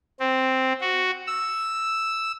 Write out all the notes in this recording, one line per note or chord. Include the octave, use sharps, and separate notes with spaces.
C4
F#4
E6